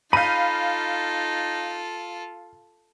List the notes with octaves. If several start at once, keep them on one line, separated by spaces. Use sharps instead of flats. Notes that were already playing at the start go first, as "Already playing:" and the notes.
D#4 F4 A4 F5 B5 G6 D#7